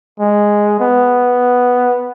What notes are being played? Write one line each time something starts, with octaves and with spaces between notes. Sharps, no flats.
G#3
B3